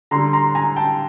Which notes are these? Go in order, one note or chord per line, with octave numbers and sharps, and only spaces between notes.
D3 G3 A#5 C6
A#5 C6
G#5 A#5
G5 A5